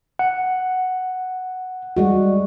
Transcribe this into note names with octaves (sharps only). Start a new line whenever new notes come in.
F#5
G3 G#3 F#4